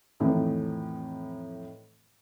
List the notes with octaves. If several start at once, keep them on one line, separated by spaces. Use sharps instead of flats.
F2 A2 D#3 E3